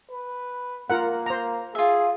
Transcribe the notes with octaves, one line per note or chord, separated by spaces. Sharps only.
B4
A#3 F4 A#4 F#5
C5 A#5
F4 G#4 E5